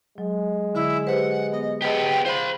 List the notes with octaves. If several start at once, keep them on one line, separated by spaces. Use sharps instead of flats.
F#3 G#3
D3 E4
G4 B4 C5 F#5
B3 D#5
B3 G4 G#4 D#5 G5 A5
F4 C5 B5